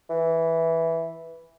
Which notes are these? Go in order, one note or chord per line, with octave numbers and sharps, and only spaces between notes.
E3